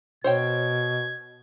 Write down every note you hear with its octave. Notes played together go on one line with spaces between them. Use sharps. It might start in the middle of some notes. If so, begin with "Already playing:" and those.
B2 C5 C#5 G5 G#6